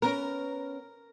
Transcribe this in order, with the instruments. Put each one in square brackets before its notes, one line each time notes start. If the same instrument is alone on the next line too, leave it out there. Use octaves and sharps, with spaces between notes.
[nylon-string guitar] B3 C#4 [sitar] A#4